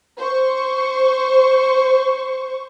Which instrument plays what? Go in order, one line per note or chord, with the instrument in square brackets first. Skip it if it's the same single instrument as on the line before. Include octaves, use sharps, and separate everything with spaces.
[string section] C5 C#6